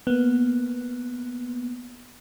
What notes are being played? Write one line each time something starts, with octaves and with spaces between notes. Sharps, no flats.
A#3 B3